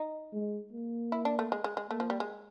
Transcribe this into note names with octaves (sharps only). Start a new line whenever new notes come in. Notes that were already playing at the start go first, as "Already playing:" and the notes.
Already playing: D#4
G#3
A#3
E4
D4
A3
G#3
G#3
G#3
A3 A#3
F3
G3
G#3